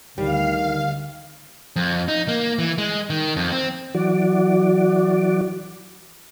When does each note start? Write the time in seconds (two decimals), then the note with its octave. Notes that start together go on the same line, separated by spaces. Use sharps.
0.18 D2 D#3 G3 F5
1.76 F2
2.08 D#4
2.28 A#3
2.59 E3
2.78 G#3
3.10 D#3
3.36 F2
3.52 C4
3.95 E3 F#3 F#4 D5